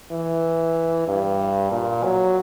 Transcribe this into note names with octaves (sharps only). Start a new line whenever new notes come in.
E3
G2
A#2
F#3